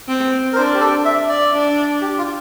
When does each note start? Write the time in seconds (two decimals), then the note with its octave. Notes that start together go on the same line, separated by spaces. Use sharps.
0.08 C4
0.53 A#4
0.56 D4 C5
0.74 G4
0.80 A4
1.05 E5
1.29 D5
1.54 D4
2.01 G4
2.18 F4